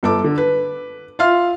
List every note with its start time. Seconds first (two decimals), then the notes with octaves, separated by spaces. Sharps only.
0.03 G1 A4 D6
0.24 D3
0.38 B4
1.19 F4 E5 F5 C6 F6